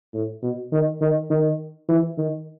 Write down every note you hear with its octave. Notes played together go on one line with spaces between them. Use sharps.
A2
B2
D#3
D#3
D#3
E3
D#3